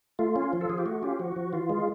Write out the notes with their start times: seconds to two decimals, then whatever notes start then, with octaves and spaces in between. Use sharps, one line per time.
0.19 A3 F4
0.36 C#4
0.53 F3
0.61 A4
0.69 F3 G#4
0.78 G4
0.86 A3 F#4
1.03 C#4 F4 G4
1.19 F3 F#4
1.36 F3
1.53 E3 F4
1.69 G#3